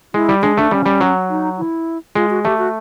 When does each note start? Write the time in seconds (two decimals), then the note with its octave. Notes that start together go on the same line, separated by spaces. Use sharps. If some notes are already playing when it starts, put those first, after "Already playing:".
0.14 G#3 E4
0.29 G3
0.42 G#3 D4
0.57 A3 D4
0.71 G3 C#4
0.86 G3
1.01 F#3
1.30 D#4
1.58 E4
2.15 G#3 F4
2.30 F#4
2.45 A3 G4
2.58 F#4